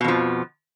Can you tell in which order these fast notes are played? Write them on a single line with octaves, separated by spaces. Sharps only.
B2 F2 F3